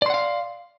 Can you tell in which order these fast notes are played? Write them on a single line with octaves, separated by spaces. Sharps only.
D5 C6 F#5 F5